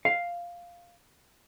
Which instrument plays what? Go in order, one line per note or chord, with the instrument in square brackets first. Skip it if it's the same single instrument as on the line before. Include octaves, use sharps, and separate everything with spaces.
[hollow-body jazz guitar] F5